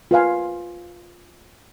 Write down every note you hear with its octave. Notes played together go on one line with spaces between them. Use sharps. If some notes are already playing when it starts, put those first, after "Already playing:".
F4 B4 F5 G#5